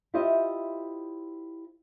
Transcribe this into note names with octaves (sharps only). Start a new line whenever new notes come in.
E4 F4 G4 C5 D#5 E5